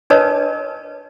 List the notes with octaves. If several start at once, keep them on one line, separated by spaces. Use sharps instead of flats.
D4 A#4 B4 C#5 D#5 A5